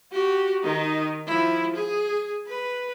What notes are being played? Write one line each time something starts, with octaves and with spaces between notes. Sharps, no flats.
F#4 G4
D#3 D#4
F3 E4
G#4
B4